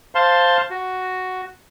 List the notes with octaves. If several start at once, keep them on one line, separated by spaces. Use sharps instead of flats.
C5 F5 A5 C6
F#4